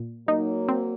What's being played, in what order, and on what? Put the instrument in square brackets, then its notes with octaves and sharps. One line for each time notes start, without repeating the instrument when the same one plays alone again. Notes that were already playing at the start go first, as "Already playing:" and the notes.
Already playing: [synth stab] A#2
[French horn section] F#3 A#3 [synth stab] D#4
[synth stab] C4